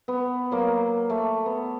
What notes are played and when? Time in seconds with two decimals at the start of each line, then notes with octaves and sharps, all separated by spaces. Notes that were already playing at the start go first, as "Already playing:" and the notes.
0.08 B3
0.51 F#3 A#3
1.10 A3
1.46 B3